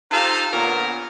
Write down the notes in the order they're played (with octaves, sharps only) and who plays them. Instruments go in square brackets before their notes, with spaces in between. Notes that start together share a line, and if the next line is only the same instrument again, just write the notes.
[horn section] D#4 F4 G4 A4 C5 F5
A#2 D3 B3 A#4 C#5 F5